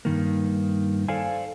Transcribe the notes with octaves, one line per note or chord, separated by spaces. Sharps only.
G2 D#3 A#3
A4 C5 D5 F5 G#5